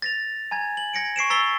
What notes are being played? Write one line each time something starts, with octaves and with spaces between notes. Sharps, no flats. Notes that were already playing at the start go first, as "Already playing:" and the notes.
A6 A#6 F7
G#5 A#5 G#6
F#7
G#6 A#6 C#7 D7
C#6 C7 D7 E7
A#5 E6 A6 B6 D7 G7